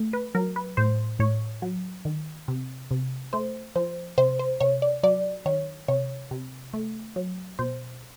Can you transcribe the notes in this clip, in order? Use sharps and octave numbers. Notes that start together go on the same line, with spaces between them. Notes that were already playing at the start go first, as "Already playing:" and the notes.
Already playing: A3
B4
F#3 A#4
B4
A2 C5
A2 C#5
F#3
D#3
C3
C3
A3 C5
F3 C5
C3 C5
C5
C3 C#5
D5
F#3 D5
D#3 C#5
C3 C#5
C3
A3
F#3
B2 C5